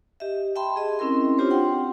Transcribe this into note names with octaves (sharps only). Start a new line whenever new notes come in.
G4 D#5 E5
E5 G5 A5 B5 C6
G#4 D#5
C4 C#4 E4 A#4 C6
C4 D4 F4 G4 C5 C#5
F#5 G5 C6